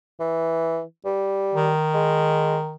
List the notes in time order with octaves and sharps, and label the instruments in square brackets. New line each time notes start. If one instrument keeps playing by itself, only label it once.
[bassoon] E3
G3
[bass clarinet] D#3
[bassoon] G#3